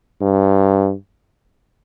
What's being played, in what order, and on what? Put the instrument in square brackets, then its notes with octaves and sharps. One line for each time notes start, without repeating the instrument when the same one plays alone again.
[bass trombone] G2